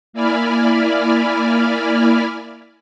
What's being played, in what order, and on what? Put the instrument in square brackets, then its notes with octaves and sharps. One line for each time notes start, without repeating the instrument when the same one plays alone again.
[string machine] A#3 E4 D5 G#5 B5 F6